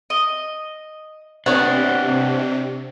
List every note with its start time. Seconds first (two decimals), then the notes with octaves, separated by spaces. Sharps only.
0.10 D#5
1.46 C3 B3 C4 D4 C#5 D5 F#5